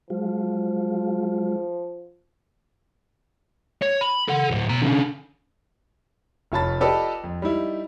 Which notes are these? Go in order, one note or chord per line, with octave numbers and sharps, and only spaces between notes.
F3 F#3 G#3 F4
C#5
B5
A4 F#5
D2 A2
B2 A#5
D3 C#4
F1 F4 C#5 A5 B5 A6
F4 G4 A4 B4 D5 D#5
F2
G3 D#4 E4